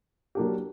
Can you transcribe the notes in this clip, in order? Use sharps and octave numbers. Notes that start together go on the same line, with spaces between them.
F#3 A#3 D4 G4